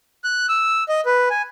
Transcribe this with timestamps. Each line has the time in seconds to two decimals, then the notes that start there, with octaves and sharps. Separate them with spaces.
0.24 F#6
0.49 E6
0.89 D#5
1.06 B4
1.30 G#5